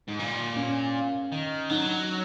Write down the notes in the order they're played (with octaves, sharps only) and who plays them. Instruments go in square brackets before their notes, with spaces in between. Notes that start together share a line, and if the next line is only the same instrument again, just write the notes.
[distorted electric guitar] G#2
A#2
[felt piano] C#4
[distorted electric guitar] D#3
[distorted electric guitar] F#3 [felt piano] D#4